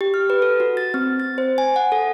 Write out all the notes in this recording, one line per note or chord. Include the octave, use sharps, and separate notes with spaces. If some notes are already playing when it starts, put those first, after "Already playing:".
G4
F6
B4
A4
F#4
A6
C4
A6
C5
G#5
F#5
A4